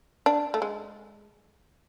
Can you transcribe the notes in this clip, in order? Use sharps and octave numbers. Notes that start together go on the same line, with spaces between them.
D4
A3
G#3